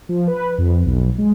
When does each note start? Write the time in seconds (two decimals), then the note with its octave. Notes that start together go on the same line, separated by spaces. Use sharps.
0.09 F3
0.28 B4
0.58 F2
0.85 B1
1.18 G#3